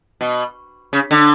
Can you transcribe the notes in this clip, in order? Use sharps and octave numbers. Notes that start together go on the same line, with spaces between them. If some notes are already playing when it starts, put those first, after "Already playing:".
B2
C#3
D3